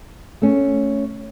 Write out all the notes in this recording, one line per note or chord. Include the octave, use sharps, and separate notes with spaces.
A3 C#4